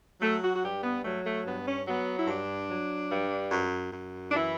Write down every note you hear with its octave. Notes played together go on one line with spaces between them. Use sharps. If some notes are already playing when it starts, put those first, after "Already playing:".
F#3 A3
F#4
F#4
G2 G4
B3
F#3 A3
A3
G2 B3
C#4
F#3 B3
E4
G2 D4
F#3
G2
F#2
F#2
D4
E3 E4